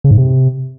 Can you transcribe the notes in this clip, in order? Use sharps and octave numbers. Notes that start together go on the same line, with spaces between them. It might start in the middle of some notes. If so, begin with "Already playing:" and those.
C#3
G#2
C3